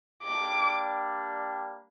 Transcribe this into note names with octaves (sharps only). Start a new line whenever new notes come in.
G3 A#3 D4 G4 D6